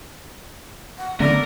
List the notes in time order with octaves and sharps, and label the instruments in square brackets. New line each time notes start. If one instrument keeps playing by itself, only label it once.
[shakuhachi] F#5
[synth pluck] D3 [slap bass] A3 B3 [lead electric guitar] A#4 [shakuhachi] D5